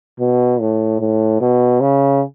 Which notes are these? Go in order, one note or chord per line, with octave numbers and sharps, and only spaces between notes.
B2
A2
A2
B2
C#3